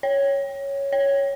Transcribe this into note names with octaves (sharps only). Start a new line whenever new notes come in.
C#5
C#5